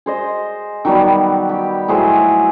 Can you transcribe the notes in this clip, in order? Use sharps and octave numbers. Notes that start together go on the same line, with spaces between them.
G#4 C5 D#5
D#3 F#3 G3 B3
G4
A2 F#3 G#4 C5